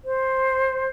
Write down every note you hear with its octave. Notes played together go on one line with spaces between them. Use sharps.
C5